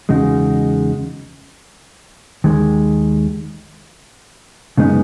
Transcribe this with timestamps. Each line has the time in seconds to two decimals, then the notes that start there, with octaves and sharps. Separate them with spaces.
0.09 E2 C#3 G#3 D#4 F#4
2.44 D#2 D#3 G#3
4.78 F#2 C#3 G#3 B3 D#4